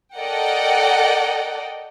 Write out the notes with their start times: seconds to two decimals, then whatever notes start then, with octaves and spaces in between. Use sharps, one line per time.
0.17 A4 A#4 D5 D#5 F#5 G5